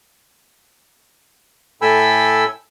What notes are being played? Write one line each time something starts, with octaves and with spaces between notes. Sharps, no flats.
A2 A4 G5 G#5 B5 E6